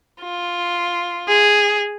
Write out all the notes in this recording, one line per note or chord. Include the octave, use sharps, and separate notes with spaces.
F4
G#4